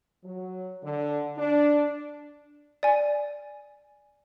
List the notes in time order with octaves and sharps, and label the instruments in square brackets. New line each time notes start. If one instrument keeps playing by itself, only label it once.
[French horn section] F#3
D3
D4
[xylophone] D5 G#5